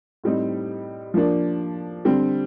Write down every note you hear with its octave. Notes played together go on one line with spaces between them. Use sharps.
A2 G3 C4 D#4
F3 A#3 D4
D3 G3 C4